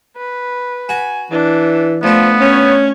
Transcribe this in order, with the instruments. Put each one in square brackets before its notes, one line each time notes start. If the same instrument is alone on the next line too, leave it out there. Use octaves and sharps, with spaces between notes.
[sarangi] B4
[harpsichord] F#4 [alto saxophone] G#5
[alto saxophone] E3 [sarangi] D4
[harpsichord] D2 A3 [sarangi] F3 [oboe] B3
[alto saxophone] C#4 [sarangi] C#5